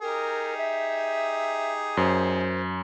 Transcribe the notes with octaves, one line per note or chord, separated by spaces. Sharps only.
D#4 G4 G#4 A#4
E5
F#2 C5